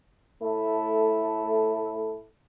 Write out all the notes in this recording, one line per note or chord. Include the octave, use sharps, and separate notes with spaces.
A2 A3 E4 A4